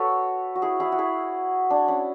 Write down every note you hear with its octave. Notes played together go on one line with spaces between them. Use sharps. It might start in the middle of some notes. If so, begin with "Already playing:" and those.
Already playing: F#4 A4 B4 C#5
F#4
E4 G#4
E4 G#4
F#4
E4 G#4
D4
C#4